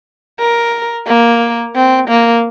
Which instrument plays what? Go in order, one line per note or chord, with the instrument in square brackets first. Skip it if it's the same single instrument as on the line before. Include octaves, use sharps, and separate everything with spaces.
[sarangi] A#4
A#3
C4
A#3